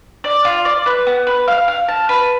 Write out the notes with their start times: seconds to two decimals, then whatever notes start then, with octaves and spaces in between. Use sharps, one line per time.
0.24 D5
0.45 F4
0.65 D5
0.86 B4
1.07 B3
1.27 B4
1.48 F5
1.68 F5
1.88 A5
2.09 B4